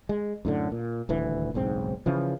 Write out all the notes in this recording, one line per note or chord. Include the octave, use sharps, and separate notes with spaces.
G#3
F#2 A2 D3
A#2
D#1 D2 E3
F#1 B1 G#2 C4
C#3 E3 F3